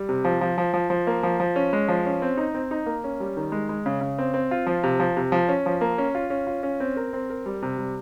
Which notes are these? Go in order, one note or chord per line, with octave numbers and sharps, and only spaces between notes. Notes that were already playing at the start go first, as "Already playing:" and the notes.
Already playing: G3
C3
F3
F3
F3
F3
F3
A#3
F3
F3
C#4
G#3
F3
C#4
C4
D#4
C4
D#4
A#3
C#4
G3
D#3
G#3
G#3
C#3
C#3
C4
C4
F4
F3
C3
F3
C3
F3
C#4
F3
A#3
C#4
F4
C#4
F4
C#4
C4
A#4
C4
A#4
G3
C3
G3